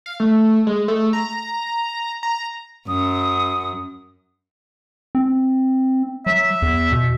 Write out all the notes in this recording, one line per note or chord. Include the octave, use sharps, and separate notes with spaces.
F5
A3
G#3
A3
A#5
A#5
F#2 D#6
C4
F#3 E5
E2
B2